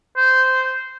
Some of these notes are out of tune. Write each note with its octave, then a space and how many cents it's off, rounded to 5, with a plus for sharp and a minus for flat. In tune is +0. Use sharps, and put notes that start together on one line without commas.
C5 -10